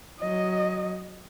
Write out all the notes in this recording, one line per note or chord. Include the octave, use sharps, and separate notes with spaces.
F#3 D#5